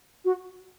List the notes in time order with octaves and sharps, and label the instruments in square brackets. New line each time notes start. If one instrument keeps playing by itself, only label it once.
[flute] F#4